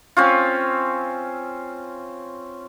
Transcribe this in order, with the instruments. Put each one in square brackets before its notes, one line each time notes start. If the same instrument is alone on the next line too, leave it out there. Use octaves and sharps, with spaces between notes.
[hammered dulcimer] C4 C#4 F4